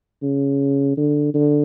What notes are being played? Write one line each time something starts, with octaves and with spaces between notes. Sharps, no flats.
C#3
D3
D3